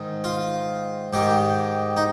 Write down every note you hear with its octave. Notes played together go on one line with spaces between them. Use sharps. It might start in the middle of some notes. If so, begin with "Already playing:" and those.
Already playing: G#2 D#3
F4
G#2 D#3 G4
D#4